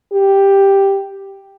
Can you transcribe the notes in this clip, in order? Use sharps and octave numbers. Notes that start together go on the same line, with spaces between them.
G4